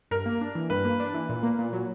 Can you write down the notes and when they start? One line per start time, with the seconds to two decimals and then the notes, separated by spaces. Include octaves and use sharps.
0.11 G2 A#4
0.26 A#3
0.41 D4
0.55 E3
0.70 G2 B4
0.85 A#3
1.00 D4
1.14 E3
1.29 A#2
1.43 A#3
1.59 A#2
1.73 F#3